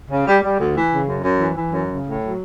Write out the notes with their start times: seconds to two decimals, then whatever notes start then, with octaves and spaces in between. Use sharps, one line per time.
0.10 C#3
0.26 G3
0.42 G3
0.59 D2
0.76 E3
0.92 C#3
1.08 F#2
1.24 F#2
1.40 E3
1.57 E3
1.72 F#2
1.89 C#3
2.06 A2
2.22 F#3